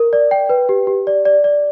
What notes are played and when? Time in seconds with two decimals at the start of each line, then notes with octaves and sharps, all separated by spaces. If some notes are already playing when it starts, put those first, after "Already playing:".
Already playing: A#4
0.13 D5
0.31 G5
0.49 B4
0.69 G4
0.87 G4
1.07 D5
1.25 D5
1.44 D5